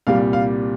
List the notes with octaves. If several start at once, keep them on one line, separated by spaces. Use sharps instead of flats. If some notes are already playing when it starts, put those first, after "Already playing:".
C2 A#2 G3 F5
F5